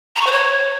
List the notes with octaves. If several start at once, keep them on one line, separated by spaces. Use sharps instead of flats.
A#5
C#6
C5
C#5